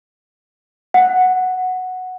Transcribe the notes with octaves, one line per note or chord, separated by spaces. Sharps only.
F#5